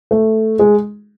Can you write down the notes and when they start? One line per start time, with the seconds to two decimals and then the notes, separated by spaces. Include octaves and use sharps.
0.11 A3
0.59 G#3